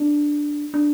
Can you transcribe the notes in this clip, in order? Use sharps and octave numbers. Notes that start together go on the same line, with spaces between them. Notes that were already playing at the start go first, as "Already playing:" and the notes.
Already playing: D4
D4